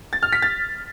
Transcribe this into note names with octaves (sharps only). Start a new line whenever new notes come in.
A6
F6
B6
A6